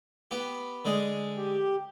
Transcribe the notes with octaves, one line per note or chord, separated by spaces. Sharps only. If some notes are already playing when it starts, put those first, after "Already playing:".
B3 G4
D3 G#3 G#4
G4